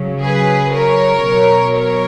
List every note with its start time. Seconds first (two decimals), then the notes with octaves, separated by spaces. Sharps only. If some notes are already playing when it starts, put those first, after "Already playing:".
Already playing: C#3 F#3
0.23 G#4 B4
0.74 A#4 C#5
1.25 B2 F#3
1.77 A#4 C#5